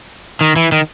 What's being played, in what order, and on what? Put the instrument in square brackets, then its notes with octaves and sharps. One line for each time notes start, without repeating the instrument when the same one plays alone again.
[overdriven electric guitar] D#3
E3
D#3